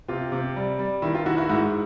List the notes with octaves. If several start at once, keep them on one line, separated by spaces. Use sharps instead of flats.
C3 F4
C3
G3
G3
D#3 E4
F4
D#3 E4 F#4
E4 F#4
G#2 E4 F#4